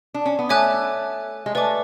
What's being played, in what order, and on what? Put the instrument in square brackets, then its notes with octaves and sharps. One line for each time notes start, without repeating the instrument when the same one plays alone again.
[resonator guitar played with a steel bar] D4
C#4
B3
[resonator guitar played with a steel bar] A3 [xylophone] C#5 E5 G#5 D6 F#6
[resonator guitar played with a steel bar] G#3
[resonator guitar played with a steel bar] A3 [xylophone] B4 D5 G#5 D6